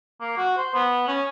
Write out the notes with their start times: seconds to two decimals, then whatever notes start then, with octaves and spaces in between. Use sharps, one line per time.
0.21 A#3
0.38 F#4
0.57 C5
0.75 B3
1.08 C#4